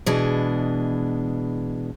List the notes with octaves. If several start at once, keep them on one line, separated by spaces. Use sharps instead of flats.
B2 E3 G#3 D4